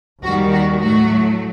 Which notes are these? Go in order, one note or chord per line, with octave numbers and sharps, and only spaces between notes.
D#2 D#3 G3 F#4
F#4
A2 F#3 A3 F#4